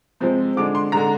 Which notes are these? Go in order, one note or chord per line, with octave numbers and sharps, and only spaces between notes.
C3 F3 G#3 C4
D3 G#3 D4 D6
C6
D3 G#3 D4 A#5